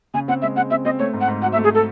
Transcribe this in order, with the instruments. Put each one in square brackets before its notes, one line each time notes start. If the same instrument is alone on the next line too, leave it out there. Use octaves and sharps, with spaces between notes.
[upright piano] C#3 [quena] G#5
[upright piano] C4 [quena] F#5
[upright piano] G#3 [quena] E5
[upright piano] G#3 [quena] F#5
[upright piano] C4 [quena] E5
[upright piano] C4 [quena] D#5
[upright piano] A3 [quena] C#5
[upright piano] G#2
[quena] F#5
[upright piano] G#2
[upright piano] F#3 [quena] F#5
[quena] E5
[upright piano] A3
[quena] G#4
A4